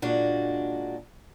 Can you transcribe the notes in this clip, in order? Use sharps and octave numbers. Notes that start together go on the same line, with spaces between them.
A#2 G#3 D4 F#4